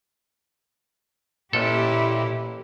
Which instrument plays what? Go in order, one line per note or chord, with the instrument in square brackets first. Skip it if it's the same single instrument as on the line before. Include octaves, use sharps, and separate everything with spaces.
[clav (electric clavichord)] A1 A4 [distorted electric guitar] A#2 [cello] E4 G4